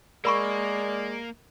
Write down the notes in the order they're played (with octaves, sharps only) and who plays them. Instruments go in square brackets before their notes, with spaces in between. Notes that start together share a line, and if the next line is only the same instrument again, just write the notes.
[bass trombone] G#3 [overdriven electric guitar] A#3 [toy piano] A#4 B5 C#6 [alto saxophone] D5